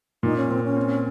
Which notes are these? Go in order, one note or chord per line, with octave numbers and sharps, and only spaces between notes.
A#2 D#4
C#4
A#2 C4
C#4
C4